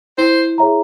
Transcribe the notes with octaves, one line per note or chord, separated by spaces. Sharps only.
E4 C5
G#4 C#5 E5 A#5